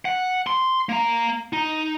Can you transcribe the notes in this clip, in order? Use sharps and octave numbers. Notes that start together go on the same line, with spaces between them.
F#5
C6
A#3 A#5
D#4